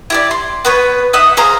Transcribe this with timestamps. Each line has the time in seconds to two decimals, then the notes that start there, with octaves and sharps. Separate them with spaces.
0.10 E4 G4 D5
0.31 C6
0.65 B3 B4 C#5
1.13 D#4 E5 F#5 D#6
1.37 G#4 C5 F5 A#5